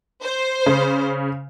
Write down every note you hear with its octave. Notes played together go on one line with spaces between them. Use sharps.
C5
C#3